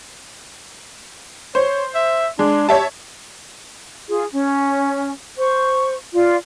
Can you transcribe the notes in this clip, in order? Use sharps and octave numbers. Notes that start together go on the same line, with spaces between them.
C5 C#5
E5
G#3 D4
G4 C#5 E5 A5
F4 G#4
C#4
C5 C#6
F4 D5